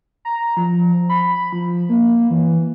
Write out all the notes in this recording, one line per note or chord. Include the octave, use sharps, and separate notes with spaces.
A#5
F3
B5
F3
A#3
E3